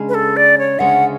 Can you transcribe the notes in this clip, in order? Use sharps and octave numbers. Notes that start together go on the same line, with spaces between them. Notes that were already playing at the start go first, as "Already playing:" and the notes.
Already playing: C#3 G#3 D4
B4
A4
D5
C#5
D2 C#3 G#3 C#4 F#5